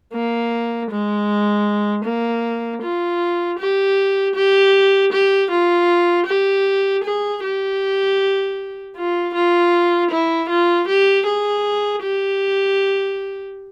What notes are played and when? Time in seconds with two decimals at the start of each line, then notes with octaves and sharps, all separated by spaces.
0.14 A#3
0.91 G#3
2.05 A#3
2.82 F4
3.59 G4
4.36 G4
5.13 G4
5.51 F4
6.27 G4
7.04 G#4
7.43 G4
8.97 F4
9.34 F4
10.11 E4
10.50 F4
10.88 G4
11.27 G#4
12.03 G4